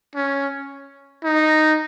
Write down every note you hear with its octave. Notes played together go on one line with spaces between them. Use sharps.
C#4
D#4